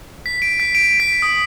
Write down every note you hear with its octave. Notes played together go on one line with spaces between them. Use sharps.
B6
D7
B6
D7
B6
D#6